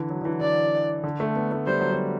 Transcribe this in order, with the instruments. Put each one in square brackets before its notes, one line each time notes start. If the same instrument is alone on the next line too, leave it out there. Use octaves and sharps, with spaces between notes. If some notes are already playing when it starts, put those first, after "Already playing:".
Already playing: [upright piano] D3 E3
F#3
D3
E3
[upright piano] D3 [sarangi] D5
[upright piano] D3
A3
B3
A3
[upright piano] G3 [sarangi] C5
[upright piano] F#3
G3